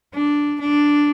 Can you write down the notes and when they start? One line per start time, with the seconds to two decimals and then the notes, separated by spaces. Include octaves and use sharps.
0.14 D4
0.60 D4